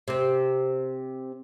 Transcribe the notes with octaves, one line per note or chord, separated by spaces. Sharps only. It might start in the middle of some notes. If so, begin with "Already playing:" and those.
C3 C4